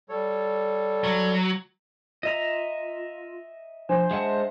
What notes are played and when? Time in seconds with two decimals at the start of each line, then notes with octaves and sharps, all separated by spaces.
0.09 G3 A4 C#5
1.04 F#3
2.23 F4 D#5 E5 A#5
3.89 F3 D4 C5
4.11 G#3 E5 F#5 A5